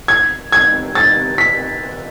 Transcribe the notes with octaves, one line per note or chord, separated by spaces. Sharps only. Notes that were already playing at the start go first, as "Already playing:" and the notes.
G#6
G#6
A6
B6